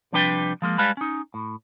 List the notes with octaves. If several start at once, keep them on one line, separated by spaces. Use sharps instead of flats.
C3 F3 G3 D4 B4 G5
F3 G#3 A#3
G3 G#3 B4 F5 A5 B5
C#4 D#4
A2